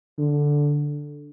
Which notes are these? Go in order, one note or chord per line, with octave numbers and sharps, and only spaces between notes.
D3